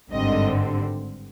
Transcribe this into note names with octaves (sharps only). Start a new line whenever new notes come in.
G#1 G2 D3 G3 C4 D#5